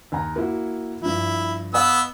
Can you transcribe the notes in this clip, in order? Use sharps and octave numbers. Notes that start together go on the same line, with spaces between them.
D#2 G#5 A#5
A#3 E4 F#4
G2 F3 E4
B3 D#5 F5 G#5 E6